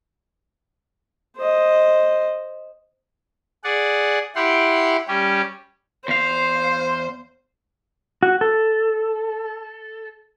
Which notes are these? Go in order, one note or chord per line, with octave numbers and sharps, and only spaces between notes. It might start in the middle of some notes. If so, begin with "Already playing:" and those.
C5 D#5
G#4 D5 F#5
E4 G4 F#5 G5 C6
G3 C#4 G4
E2 C5 F5
F#4
A4